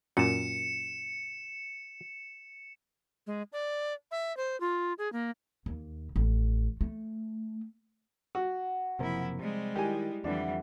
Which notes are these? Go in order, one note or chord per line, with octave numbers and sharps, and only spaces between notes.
F#2 A#2 C#7 E7
G#3
D5
E5
C5
F4
G#4
A#3
D#2
A1
A3
F#4 F#5
F#1 C3 F3 A#3 E4
C3 G3 G#3
D#3 E4 G4 G#5
F2 D3 E3 G3 D4 E5 F#5